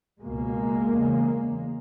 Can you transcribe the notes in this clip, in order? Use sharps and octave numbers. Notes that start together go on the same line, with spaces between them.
C#2 B2 G#3 A#3
E2 C#3